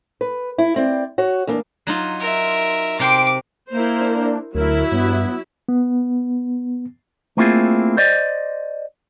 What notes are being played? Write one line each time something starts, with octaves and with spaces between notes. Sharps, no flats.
B4
E4
C4 D5
F#4 C#5
E2 A#3 D4
F#3 D#4 F4
A#4 E5
C3 G5 C6 D6
A#3 E4 A#4 C5
D4
D2 F#3 E4 A#4 E5
G2 B3
B3
A3 A#3 C4 E4 F4 G#4
C5 D5 D#5